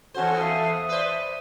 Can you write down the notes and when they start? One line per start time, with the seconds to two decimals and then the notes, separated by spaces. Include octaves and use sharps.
0.14 E2 C#4 F#4 A4 C5
0.37 A4 E5 F5 D#6
0.89 B4 C5 D5 E5